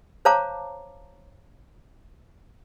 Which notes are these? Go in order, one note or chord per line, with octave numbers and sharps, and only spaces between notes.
C5 C#5 F5 A5 A#5 D6